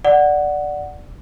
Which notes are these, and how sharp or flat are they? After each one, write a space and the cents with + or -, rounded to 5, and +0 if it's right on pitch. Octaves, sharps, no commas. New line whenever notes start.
D5 +0 F#5 +0